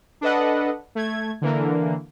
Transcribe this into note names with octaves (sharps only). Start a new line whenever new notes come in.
D4 A4 B4 D#5 F#5
A3 G#6
D3 E3 A#3